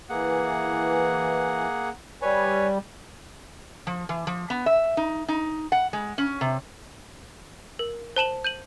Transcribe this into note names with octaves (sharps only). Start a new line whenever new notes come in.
E3 A#3 G#4 F#5
G3 B4 C#5 G#5
F3
E3
F3
B3
E5
D#4
D#4
F#5
G#3
C#4
C3
A#4
C5 A5 E7 F#7
G6 D#7 F#7